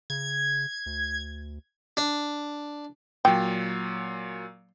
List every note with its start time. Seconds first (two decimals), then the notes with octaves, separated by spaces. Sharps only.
0.10 C#3 G#6
0.86 D2
1.97 D4
3.25 A#2 F#3 G5